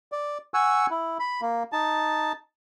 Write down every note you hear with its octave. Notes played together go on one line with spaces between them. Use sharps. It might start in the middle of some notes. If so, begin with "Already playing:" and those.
D5
F#5 G#5 C#6 E6
E4
B5
A#3
D#4 A5